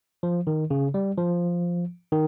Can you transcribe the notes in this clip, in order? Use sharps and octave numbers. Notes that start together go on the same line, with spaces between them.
F3
D#3
C#3
G3
F3
D#3